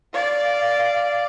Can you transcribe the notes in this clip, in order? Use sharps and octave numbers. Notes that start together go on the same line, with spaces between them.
D5 F5